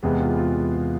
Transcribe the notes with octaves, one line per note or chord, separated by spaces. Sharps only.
E2 C3 G#3 B3 G#4
F4
F4